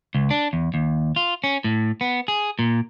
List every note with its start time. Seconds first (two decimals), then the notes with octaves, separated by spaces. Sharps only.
0.15 C#2
0.30 D4
0.53 E2
0.74 D#2
1.16 F4
1.44 C#4
1.64 A2
2.01 B3
2.28 G#4
2.59 A#2